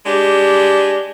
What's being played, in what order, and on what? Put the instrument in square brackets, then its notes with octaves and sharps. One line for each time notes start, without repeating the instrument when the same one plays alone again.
[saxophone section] G#3 D4 G4